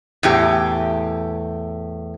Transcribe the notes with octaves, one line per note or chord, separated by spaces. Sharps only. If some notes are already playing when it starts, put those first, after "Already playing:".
E2 A2 G4